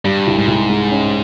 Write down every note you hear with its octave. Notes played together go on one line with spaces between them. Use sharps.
G2 G3
C2
G#2
C2
G#3
C#4